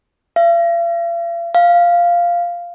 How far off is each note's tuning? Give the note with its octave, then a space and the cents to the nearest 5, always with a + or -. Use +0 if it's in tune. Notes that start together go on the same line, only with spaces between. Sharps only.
F5 -45
F5 -5